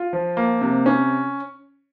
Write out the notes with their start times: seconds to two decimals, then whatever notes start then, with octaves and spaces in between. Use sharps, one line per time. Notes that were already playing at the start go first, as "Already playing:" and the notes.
Already playing: F4
0.13 F3
0.37 A#3
0.61 C3
0.86 C#4